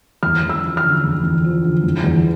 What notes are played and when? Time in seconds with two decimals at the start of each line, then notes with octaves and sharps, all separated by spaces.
0.23 E2 F6
0.43 E2
0.49 E6
0.64 F3
0.77 F6
0.83 D3
1.04 E2
1.23 E2
1.44 F3
1.64 D3
1.84 E2
2.04 E2